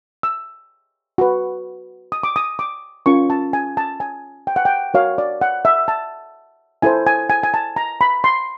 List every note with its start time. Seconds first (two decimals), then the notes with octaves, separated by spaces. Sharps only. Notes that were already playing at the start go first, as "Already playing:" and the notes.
0.23 E6
1.18 F#4 B4
2.12 D#6
2.23 D6
2.36 D#6
2.59 D6
3.06 C#4 F4 A#4 C#6
3.30 A5
3.53 G#5
3.77 A5
4.00 G#5
4.47 G5
4.56 F#5
4.65 G5
4.94 F#4 A#4 C#5 F5
5.18 D5
5.41 F#5
5.65 E5
5.88 A5
6.82 E4 A4 C5 G#5
7.07 G#5
7.30 G#5
7.43 G#5
7.54 A5
7.76 A#5
8.01 B5
8.24 C6